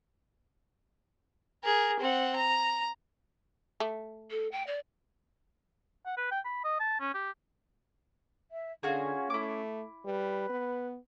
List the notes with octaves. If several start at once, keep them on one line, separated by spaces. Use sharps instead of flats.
G#4 A#4
C4 F#5
A#5
A3
A4
G5
D5
F#5
B4
G5
B5
D#5
A5
C#4
G4
E5
D3 C#4 F4 F#4 G#4
A3 E4 D6
G3 B4
B3